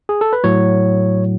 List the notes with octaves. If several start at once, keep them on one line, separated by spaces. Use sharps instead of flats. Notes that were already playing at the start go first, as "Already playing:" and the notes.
G#4
A4
B4
A2 F#3 C#5